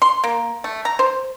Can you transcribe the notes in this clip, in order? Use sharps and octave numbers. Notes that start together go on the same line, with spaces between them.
C6
A#3
A3
A#5
C5